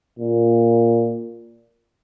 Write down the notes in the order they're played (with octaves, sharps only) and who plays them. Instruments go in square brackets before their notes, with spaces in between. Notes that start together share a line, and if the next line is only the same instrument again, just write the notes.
[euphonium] A#2